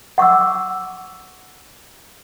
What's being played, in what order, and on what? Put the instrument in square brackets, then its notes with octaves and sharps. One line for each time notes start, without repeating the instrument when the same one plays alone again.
[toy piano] F#5 C#6 D6 E6